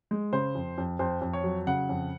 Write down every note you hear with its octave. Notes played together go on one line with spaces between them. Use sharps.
G#3
C#3 C5
F2
F2
F2 C5
F2
C#5
F#3
C#3 F#5
F2